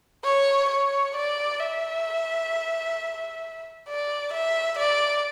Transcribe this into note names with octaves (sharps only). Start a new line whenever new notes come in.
C#5
C#5
D5
E5
D5
E5
D5